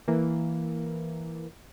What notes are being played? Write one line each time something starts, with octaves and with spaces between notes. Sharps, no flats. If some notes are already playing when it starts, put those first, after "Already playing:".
E3 A#3